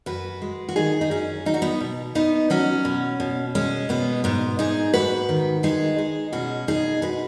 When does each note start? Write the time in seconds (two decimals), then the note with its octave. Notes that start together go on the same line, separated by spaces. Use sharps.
0.06 F#2 F#4 B4
0.42 G#3
0.69 F#4
0.76 D#3 D#4 G#4
1.01 D#4
1.11 F#2 C#4 F#4
1.46 F#3 D#4
1.54 F#4
1.62 B3 D#4
1.80 B2
2.15 B2 B3 D#4
2.50 F#3 C#4 F#4
2.85 B2
3.20 B2
3.55 G#3 C#4
3.89 B2 B3
4.24 G#2 B3
4.59 G#2 D#4 G#4
4.94 G#2 F#4 B4
5.29 D#3
5.63 G#3 D#4 G#4
5.98 G#3
6.33 B2 C#4 F#4
6.68 B2 D#4 G#4
7.02 G#3 F#4 B4